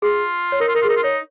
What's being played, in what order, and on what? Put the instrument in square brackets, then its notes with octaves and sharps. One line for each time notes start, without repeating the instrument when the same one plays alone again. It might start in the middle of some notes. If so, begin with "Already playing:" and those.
[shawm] F4 [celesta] G#4
[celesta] C#5
[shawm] D#4 [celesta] A#4
[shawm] F4
[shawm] D#4 [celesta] A#4
[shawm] F4
[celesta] G#4
[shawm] D#4 [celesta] A#4
[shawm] F4
[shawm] D#4 [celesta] C#5